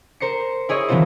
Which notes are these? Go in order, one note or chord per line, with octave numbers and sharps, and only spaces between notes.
A#4 C5 C7 C#7
E4 G#4 C#5 D#5
D#3 E3 F#3 C4 F4 C5